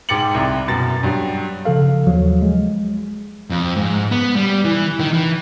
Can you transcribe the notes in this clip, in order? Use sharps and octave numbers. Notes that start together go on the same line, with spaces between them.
G#2 G5 D6 A6 C#7 F#7
C2
F#2 B2 A6
G2 F#3
C#3 F3 A4 F5
D#2 F3 F#3
G#3
F2
G#2
B3
G3
E3
D#3
E3